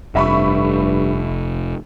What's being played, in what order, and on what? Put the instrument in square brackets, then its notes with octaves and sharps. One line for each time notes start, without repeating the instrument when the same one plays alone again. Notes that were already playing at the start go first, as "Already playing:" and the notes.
[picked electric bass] F1 [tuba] G2 [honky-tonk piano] E5 B5 C#6